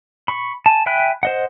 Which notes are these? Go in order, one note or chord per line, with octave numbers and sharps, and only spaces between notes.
B5 C#6
G#5 A5
E5 G5 G#5 B5 F#6
C5 D#5 F#5